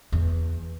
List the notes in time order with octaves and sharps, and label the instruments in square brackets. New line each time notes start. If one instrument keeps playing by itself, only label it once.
[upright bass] E2